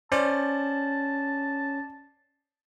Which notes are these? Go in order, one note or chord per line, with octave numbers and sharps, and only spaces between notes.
C#4 C5 D5 A5